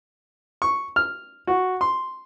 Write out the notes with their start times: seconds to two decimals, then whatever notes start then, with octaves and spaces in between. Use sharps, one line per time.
0.62 C#6
0.96 F6
1.47 F#4
1.81 C6